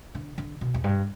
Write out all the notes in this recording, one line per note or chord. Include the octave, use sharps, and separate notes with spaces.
D3
D3
B2
E2
G2